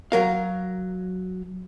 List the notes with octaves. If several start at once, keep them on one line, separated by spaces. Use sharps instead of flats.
F#3 A#4 F5